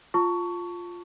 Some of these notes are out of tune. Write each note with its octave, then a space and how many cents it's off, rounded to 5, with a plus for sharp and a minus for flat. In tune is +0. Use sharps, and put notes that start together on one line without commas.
F4 +5 A5 +20 C#6 +15